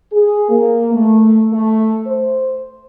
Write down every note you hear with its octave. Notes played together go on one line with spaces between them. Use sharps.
G#4
A#3
A3
A3
C5